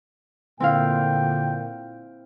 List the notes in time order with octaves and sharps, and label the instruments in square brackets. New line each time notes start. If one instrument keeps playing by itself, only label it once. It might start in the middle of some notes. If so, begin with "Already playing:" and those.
[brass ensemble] A#2 [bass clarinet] D3 [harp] C4 E4 F5 [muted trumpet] G5